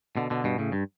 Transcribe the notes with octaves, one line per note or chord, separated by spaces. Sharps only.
B2 D3
B2 D3
G2 B2
A2 C#3
G2